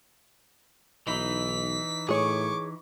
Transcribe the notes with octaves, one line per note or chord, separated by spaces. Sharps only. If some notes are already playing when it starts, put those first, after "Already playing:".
B1 E3 D#4 E4 B6
A2 G#4 C#5 C#6 D6